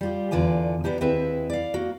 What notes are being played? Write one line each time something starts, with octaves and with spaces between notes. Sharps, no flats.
G3 F4 G4
E2 D3 F4 D5 G#5
B3 D4 D#4 G4
D#2 C4 E4 G#4 B4 E5
D5 F5
A#3 F#4